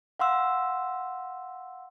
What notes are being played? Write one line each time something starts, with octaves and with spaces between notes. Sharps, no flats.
F5 F#5 C6 E6